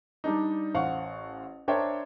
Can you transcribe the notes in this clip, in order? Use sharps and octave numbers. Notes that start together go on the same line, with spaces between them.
G3 D4 D#4
A1 C5 F5 F#5 C#6
D4 A#4 C5 C#5 E5 G5